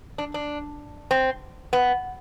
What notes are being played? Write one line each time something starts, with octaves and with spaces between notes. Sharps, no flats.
D4
D4
C4
B3